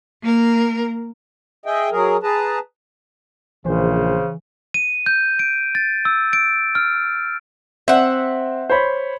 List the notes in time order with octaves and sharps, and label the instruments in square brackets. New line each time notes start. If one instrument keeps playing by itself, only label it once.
[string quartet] A#3 A#4
[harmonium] G#4 D#5 E5 G5
F#3 G#4 A#4
G#4 B4 A5 A#5
[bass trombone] A#1 [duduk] C#3 [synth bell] E3 [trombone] C5
[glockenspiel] D#7
G6
D7
A6
E6
D7
F6
[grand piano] C4 [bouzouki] E5 F#5
[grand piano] C5 C#5 B5